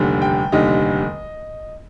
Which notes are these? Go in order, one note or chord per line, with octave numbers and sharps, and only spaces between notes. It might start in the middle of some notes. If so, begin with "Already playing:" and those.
Already playing: F1 D#2 D3 G3
G5
F1 D#2 D3 G3 D#5